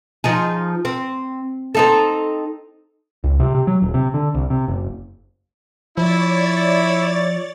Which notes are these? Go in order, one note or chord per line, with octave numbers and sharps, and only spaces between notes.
F3 D#4 G#4
C4
C4 D#4 A4
C#2
C3
C3
F#3
D#1
C3
D3
C2
C3
F#1
F3 E4 C#5 D5 A6